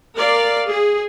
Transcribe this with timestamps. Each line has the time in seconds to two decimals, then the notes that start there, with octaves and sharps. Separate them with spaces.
0.16 A#4 D5 F5
0.66 G#4